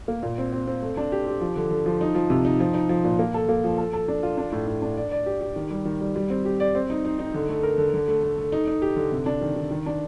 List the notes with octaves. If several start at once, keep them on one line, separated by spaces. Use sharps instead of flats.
A#3
A#2
C4
C4
C4
A3
D4
G4
G4
F3
D3
D3
F3
D#4
F3
C3
D#4
F3
D#4
F3
A#2
A#3
A4
A#3
F3
A4
A4
D4
F4
D4
A2
A2
D4
D5
D5
G4
G4
D#3
G3
D#3
G3
G3
C4
G4
D5
C4
D#4
D#4
D#4
D3
A3
A#4
D3
D3
A3
A3
A3
D#4
D#4
G4
D3
C3
D4
D#3
D#3
D#3
D4